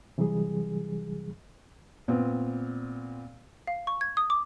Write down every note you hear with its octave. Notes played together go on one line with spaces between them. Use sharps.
C3 E3 F#3 G3 G#4
A#2 B3 C4
F5
C#6
G#6
D#6
D6